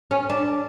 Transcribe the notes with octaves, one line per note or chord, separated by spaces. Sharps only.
C#4
D4